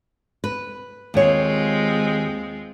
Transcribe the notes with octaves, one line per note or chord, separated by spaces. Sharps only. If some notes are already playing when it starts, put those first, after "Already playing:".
B4
D#2 G#3 C4 F4 C#5